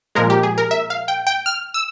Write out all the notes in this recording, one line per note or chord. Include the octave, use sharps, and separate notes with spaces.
A#2 F3 G#3 A#4
G4
G#4
A#4
E5
F5
G5
G5
F6
E6